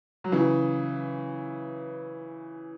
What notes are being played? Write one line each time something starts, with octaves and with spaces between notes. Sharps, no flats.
F#3
C#3 E3